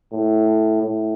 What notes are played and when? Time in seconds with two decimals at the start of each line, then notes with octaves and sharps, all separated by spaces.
0.12 A2
0.83 A2